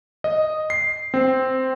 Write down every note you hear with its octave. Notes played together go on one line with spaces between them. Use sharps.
D#5
C7
C4